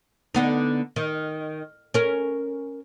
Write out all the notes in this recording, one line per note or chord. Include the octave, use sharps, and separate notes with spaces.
D3 B3 D#4
D#3
C#4 A#4